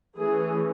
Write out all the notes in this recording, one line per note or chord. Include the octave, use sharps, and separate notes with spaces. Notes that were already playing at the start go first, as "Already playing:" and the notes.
E3 A3 C#4 G#4